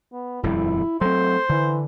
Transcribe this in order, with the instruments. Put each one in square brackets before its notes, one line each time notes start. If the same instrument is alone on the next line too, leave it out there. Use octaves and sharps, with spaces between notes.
[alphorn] B3
[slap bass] D#1 F2 G3 [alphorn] E4
[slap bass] F#3 C4 [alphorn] A3 [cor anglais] C5
[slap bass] D3 [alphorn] E3